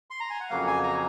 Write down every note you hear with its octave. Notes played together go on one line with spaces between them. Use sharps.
C6
A#5
G#5
F#5
F2 C#3 F#3 A#3 F5
G#5
A#5